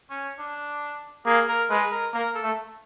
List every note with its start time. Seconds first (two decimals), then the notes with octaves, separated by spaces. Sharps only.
0.10 C#4
0.39 D4
1.26 A#3 G#4
1.48 A#4
1.70 G#3 B4
1.91 A#4
2.14 A#3 A#4
2.35 A4
2.43 A3